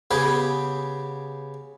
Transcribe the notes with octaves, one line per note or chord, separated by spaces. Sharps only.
C#3 B3 G4 G#4 B4